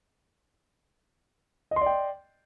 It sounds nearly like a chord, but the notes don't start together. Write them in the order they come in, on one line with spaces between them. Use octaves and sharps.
D#5 C6 D5 G5